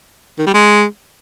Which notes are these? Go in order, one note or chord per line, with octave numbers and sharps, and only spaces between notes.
D#3
G3
G#3